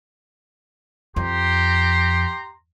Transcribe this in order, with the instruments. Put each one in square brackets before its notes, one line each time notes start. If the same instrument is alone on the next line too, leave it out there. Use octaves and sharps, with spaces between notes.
[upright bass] F2 [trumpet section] G4 A#5 C6